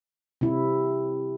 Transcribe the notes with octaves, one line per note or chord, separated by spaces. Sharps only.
C3 E4